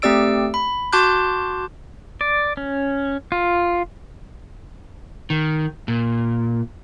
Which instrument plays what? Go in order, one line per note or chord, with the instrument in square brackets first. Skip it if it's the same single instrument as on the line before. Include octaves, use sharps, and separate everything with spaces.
[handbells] A3 C4 G4 D5 E6 D7
B5
F#4 A5 C6 D6 F#6 G6
[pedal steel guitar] D5
C#4
F4
[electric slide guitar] D#3
A#2